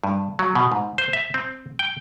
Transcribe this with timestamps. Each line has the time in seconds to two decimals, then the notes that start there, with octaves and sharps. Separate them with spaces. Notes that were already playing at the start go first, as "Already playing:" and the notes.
0.04 G2
0.39 F#3
0.55 B2
0.72 G#2
0.98 C5
1.13 E5
1.34 C4
1.79 G5